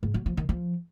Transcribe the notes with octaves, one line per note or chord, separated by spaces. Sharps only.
G#2
F#3
F3
D#3
F3